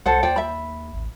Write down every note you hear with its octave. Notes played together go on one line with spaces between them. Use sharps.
C2 A4 C5 F#5
D#2 C5 D5 G5
E5 B5
A1